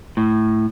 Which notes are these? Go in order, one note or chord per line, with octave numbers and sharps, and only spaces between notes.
A2